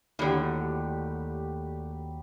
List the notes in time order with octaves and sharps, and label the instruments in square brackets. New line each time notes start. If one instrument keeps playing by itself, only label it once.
[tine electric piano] D#2 [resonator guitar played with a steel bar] A2 D3 [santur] F#3 G3 G4